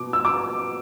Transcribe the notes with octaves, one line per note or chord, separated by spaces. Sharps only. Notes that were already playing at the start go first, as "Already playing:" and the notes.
Already playing: B2 D6
E6
D6